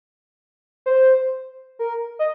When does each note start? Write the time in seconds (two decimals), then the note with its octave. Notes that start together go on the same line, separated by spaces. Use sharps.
0.86 C5
1.79 A#4
2.19 D#5